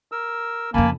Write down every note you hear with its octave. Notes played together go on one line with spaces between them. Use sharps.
A#4 E6
F2 C#3 A#3 G#5 A5 B5